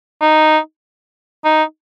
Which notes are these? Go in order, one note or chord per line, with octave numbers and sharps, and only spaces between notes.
D#4
D#4